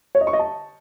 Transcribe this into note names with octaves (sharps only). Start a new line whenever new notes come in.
C#5
D#5
C#6
D#5
A5